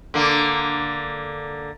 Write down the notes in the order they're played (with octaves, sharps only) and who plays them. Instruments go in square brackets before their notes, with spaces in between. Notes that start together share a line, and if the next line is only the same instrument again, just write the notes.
[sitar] D3 A#3